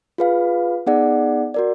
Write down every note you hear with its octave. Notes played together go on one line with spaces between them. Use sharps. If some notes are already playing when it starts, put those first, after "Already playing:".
F4 G#4 B4 F5
B3 D#4 G#4 D5 F#5
F#4 A#4 D5